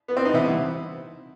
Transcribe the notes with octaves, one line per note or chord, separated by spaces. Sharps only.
B3
C4
D#4
C3 E3 B3 E4